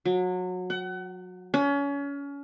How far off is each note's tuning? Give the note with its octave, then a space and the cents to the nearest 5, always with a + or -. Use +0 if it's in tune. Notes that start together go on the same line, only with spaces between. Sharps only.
F#3 -25
F#5 +30
C#4 +30